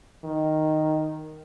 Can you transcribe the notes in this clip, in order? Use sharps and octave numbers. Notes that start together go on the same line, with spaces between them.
D#3